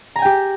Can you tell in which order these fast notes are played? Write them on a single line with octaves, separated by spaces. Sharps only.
A#5 G#5 G5 G4